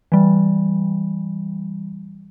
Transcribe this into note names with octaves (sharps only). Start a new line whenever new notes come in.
E3 G3